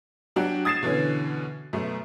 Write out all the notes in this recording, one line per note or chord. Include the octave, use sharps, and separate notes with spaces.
F#3 D4 F#4 G4
D#6 G#6 A6 C7 E7
B2 D3 E3 C#4
F#2 B2 A3